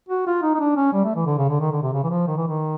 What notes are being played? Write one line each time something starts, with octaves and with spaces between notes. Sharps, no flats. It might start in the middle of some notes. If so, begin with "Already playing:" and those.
F#4
F4
D#4
D#4
D4
C#4
G3
A3
E3
D3
C#3
D3
D#3
D3
C3
C#3
E3
F3
D#3
E3
D#3